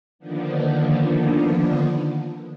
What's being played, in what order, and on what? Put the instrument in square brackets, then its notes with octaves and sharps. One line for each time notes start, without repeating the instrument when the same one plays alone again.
[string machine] D3 D#3 F3 A#3 B3 D4